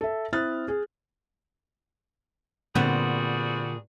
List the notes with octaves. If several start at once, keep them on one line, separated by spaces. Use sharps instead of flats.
A4 E5
C4 E4 D#6 F6 F#6 A6
G#4
A#2 D3 G3 B3 C4 F#4 G#4